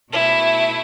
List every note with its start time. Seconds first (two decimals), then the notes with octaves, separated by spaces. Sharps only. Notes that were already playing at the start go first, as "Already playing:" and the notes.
0.11 B2 A3 E4